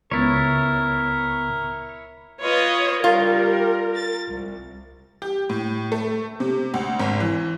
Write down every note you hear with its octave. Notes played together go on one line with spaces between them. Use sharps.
C#2 B3 E4 A#4 C#5 A6
F4 B4 C#5 D#5
G3 F4 A#4
A6
C2
G4
A2
A3
C3
D2
G#1
E3